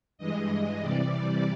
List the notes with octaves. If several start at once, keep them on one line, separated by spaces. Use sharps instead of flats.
G2 E3 G#3 D#5
C3 E3 G3 D5